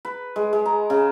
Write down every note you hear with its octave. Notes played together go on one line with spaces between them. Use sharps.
B4
G#3
G#3
A#5
C#3